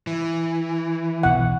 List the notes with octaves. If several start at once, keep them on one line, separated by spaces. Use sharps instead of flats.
E3
D#1 B1 B2 F#5